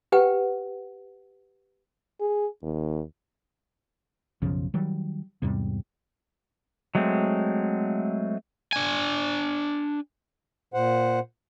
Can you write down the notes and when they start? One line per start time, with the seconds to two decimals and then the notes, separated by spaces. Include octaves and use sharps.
0.12 G4 B4 F#5 G5
2.21 G#4
2.63 D#2
4.42 B1 F#2 C#3 F3
4.74 D#3 F#3 G3
5.42 E2 G#2 C3 G3
6.95 F#3 G#3 A3 C4
8.73 D4 G#5
10.74 A#2 C5 F#5